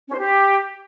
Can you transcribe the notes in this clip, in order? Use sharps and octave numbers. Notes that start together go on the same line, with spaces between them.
C#4
C5
G4